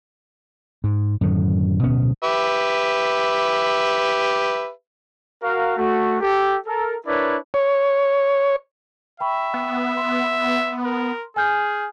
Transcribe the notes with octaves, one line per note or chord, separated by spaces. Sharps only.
G#2
F#2 A2 D3 D#3
D1 B2 B3 C#4
G4 B4 E5
F#4 A#4 F5
A3 F#4
G4 A4
A4 A#4
D4 E4 A#4 B4 C#5 D5
C#5
E5 G5 B5 C#6
B3
C6
A#4
G#4 G#5 F6 G6